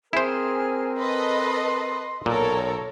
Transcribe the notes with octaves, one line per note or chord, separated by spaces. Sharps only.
C4 E4 G#4 A#4 C5 G#5 F6
A4 B4 D#5 C6
B1 A#2 A4 A#4 C#5